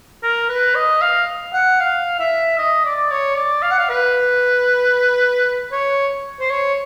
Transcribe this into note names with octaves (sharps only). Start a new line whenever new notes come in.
A#4
B4
D#5
F5
F#5
F5
E5
D#5
D5
C#5
D5
F5
F#5
F5
B4
C#5
C5
C#5